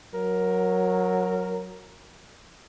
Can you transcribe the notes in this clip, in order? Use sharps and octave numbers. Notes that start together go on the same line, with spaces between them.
F#3 A#4